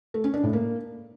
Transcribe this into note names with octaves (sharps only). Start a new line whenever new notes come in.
A3
C#4
D4
A2
A#3